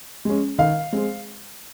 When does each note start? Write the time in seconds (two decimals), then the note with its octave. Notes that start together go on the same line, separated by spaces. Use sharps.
0.25 G#3 C#4
0.58 D#3 F5
0.93 G#3 C4